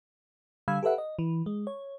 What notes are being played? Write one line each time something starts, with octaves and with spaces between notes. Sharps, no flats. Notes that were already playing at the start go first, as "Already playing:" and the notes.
D3 G3 F5 B5 E6 G#6
G4 A4 B4 E5 F#5
D#5
E3
G#3
C#5